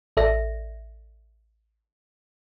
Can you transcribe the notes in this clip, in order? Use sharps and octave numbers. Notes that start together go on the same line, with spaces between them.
A1 A4 D5 E5 A#6